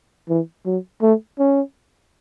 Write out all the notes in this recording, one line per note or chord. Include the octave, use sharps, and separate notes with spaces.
E3
F#3
A3
C#4